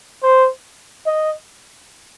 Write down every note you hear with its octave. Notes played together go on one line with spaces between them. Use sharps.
C5
D#5